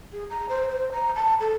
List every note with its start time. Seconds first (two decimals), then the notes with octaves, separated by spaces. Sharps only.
0.12 G#4
0.30 A#5
0.49 C5
0.69 C5
0.92 A#5
1.16 A5
1.40 A4